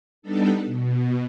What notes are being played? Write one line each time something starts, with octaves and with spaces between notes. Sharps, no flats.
G3 B3 D4 D#4 A4
B2